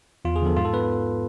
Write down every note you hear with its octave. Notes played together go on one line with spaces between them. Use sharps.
E2 F4
G#4
D3 F3 B3 A4
G#2 F4
A4
B3 B4